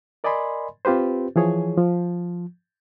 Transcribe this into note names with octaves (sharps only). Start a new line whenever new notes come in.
A#4 D5 D#5 G#5 B5 C6
C4 F4 G4 B4 C5
E3 F3 G#4 C#5
F3